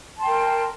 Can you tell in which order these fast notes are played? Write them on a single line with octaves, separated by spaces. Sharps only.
A5 C6 G5 A#4